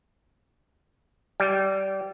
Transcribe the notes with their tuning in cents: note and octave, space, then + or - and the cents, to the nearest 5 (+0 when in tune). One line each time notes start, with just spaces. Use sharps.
G3 -20